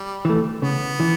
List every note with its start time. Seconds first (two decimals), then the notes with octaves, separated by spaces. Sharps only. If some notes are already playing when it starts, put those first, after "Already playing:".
Already playing: G3
0.25 E3 A3
0.62 C#3 B3
1.00 E3